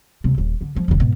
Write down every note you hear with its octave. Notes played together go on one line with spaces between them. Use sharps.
C#2 C3
D#1
D3
F3 G#3
F1 D3
G#2 B2